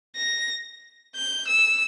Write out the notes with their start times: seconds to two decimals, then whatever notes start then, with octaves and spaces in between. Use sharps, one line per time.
0.17 A#6
1.16 G6
1.48 E6